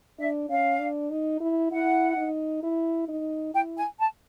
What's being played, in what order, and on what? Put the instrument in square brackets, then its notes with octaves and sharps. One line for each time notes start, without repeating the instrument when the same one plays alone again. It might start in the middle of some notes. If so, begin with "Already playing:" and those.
[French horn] D4 [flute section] E5
[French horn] C#4 [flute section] F5
[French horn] D4
D#4
E4
[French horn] E4 [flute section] F#5
[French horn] D#4
E4
D#4
[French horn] E4 [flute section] G5
[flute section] G#5
A5